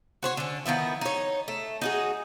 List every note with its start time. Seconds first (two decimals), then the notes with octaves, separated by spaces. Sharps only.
0.23 F#4 C5 C#5
0.37 D3 C#4
0.66 D#3 F3 B3 E4
1.01 D#4 C#5
1.48 A3
1.81 D#4 F#4 G#4